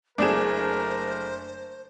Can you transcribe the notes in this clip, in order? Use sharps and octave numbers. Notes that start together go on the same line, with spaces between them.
F#1 A3 D4 G#4 A#4 C5 E7